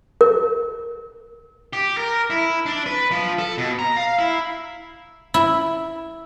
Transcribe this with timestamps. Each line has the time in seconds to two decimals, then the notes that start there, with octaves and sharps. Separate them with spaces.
0.21 A#4
1.73 G4
1.97 A#4
2.30 E4
2.66 D4
2.86 B4
3.11 F3
3.39 A4
3.58 B2
3.79 A#5
3.97 F5
4.19 E4
5.34 E4